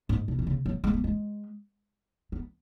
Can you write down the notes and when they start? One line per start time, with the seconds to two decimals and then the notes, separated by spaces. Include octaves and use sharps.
0.09 G#2
0.28 B2
0.39 E3
0.47 C#3
0.66 F#3
0.84 G#3
0.93 B3
1.04 G#3
2.32 B3